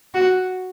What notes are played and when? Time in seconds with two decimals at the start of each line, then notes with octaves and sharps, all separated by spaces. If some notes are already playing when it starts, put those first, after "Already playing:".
0.14 F#4